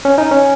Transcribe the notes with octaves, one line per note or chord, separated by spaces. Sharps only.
C#4
D#4
C#4